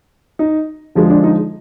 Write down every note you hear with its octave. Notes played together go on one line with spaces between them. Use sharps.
D#4
D3 F3 G#3
D4
D#4